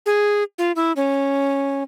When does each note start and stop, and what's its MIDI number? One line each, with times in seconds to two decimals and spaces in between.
0.06 0.43 68
0.58 0.72 65
0.76 0.92 64
0.96 1.83 61